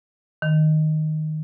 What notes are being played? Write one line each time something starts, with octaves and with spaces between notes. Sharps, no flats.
D#3